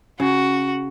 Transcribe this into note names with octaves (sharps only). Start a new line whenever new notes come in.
C#3 F#4